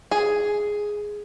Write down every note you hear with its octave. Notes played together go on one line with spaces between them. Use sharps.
G#4